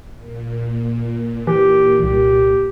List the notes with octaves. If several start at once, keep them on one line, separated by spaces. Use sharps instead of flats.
A#2
E3 G4
C2 G4